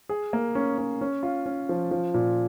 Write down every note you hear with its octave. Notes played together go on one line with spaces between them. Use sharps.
G#4
A#3
C#4
C#4
C#4
F4
C#4
F3
F3
A#2